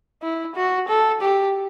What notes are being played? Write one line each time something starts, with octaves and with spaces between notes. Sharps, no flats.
E4
F#4
A4
G4